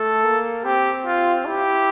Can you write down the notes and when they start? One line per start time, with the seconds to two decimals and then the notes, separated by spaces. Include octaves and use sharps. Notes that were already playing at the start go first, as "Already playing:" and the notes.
Already playing: A3 A4
0.24 A#3
0.64 C4 G4
1.06 F4
1.46 E4 G4